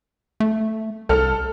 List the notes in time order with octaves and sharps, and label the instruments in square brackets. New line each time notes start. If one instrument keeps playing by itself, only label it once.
[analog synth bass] A3
[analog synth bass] C2 [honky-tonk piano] A4 F6